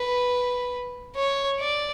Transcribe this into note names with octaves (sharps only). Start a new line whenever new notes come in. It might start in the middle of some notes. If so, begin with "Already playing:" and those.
Already playing: B4
C#5
D5